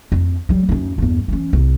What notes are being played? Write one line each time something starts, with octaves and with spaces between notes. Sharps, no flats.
F2
F#3 G3
F#2 D#4
E2 G2
E3 C#4
C2